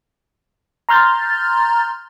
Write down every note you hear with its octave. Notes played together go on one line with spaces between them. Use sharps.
A#5 C6 F6 G6 A6